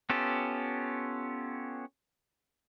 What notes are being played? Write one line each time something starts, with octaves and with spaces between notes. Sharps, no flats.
B3 C#4 F4 G4 A4